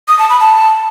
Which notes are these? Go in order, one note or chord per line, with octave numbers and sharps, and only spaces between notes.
D#6
A5
B5
A5